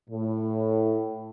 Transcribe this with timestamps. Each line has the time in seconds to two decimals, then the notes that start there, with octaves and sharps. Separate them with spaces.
0.10 A2